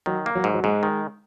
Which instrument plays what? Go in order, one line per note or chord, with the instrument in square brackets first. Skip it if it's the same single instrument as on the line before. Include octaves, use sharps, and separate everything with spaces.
[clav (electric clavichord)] D#3 [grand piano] F#3
[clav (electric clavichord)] A#3
[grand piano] F#3
[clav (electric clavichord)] G#2
[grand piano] F#3
[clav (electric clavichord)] G#2 [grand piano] G#3
[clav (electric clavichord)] D#3